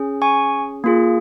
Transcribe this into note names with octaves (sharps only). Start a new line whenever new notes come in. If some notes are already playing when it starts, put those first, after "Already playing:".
Already playing: C#4 G#4
G#5 C#6
A#3 F4 G#4